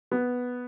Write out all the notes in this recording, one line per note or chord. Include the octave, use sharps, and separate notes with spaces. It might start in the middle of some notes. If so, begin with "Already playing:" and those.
B3